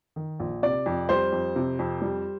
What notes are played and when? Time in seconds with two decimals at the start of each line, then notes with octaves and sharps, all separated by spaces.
0.16 D#3
0.39 A#1
0.63 C3 D5
0.86 F2
1.09 G3 C5
1.32 F2
1.56 C3
1.79 F2
2.02 G3